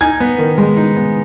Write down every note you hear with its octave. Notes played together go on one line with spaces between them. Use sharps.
D#4 G#5 G#6
B3
D#3
G#3
D#4
B3